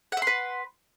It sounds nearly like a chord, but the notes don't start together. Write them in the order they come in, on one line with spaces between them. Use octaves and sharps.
F#5 E5 C6 B4